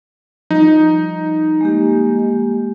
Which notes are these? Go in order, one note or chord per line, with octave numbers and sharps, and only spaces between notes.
F3 G3 D#4
G#3 A#3 G4